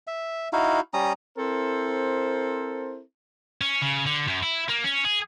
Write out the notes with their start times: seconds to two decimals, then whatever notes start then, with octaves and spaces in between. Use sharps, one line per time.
0.07 E5
0.53 D#4 E4 F#4 F5
0.94 G3 C#4 A#5 D#6
1.37 C4 E4 A4 A#4 C5
3.61 C#4
3.82 C#3
4.06 D3
4.28 F#2
4.43 E4
4.69 A#3
4.84 C#4
5.05 G#4